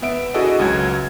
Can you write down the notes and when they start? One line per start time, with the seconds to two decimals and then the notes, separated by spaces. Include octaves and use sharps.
0.02 B3 E5 D7
0.34 D4 E4 F#4 G#4 A4 D#5
0.59 C#2 F#3 G#6